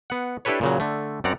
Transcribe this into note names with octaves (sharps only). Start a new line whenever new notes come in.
B3 F#5
D4 E4 G4 A4 B4 C#5
A#2 C#3 F#3
D3 A3
F#2 C4 D5 F#5 A#5